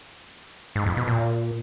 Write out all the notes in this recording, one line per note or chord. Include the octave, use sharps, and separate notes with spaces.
G#2
F2
B2
A#2